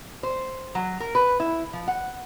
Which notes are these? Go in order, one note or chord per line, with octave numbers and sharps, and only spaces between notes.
C5
F#3
A#4
B4
E4
F3
F#5